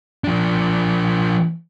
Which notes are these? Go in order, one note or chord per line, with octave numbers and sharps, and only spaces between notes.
F3 D4